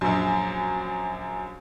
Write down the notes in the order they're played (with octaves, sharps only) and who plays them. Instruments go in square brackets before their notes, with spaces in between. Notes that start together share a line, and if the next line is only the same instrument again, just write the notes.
[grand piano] A#1 F#2